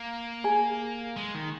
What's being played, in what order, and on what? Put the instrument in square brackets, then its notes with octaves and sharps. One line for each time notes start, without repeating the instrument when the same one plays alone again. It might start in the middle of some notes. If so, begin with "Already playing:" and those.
Already playing: [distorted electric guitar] A#3
[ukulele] G#4
[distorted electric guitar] G#3
D#3